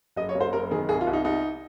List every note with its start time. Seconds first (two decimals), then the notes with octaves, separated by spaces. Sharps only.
0.16 F#1 D#5
0.29 C#5
0.35 F#1
0.40 C5
0.53 F#1 A#4
0.71 D#3 G#4
0.89 C2 G#4
1.01 F4
1.07 C2
1.13 D#4
1.25 C2 D#4